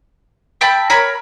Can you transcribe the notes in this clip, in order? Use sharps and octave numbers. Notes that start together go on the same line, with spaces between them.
E5 G5 A5 B5
A#4 C#5 B5